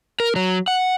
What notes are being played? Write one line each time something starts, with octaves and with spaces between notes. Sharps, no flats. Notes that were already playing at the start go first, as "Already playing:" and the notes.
A#4
F#3
F#5